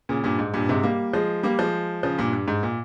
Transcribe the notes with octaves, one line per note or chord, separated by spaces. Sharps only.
A#2 C#3
G2 A#2
G#2
G2 A#2
G#2 C3
G3 A#3
F3 G#3
G3 A#3
F3 G#3
C#3 F3
G2 A#2
G2
G#2
A#2